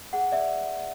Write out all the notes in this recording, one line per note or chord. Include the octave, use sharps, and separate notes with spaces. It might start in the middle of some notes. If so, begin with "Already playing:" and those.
G#4 F#5
D5 E5